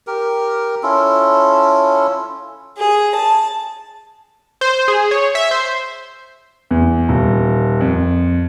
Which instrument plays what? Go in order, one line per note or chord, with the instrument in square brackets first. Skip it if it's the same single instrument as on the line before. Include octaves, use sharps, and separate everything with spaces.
[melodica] G4 A#4
C#4 E4 F4 A4
[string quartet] G#4
A5
[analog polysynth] C5
G#4
C#5
E5
C5
[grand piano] E2
D#1
F2